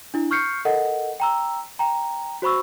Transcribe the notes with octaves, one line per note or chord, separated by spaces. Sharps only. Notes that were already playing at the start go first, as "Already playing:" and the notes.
D4 E4
C#6 F6 G6 C7 C#7
A4 A#4 D#5 F#5
G5 A#5 E6
G5 A#5
F#4 C5 B5 C#6 E6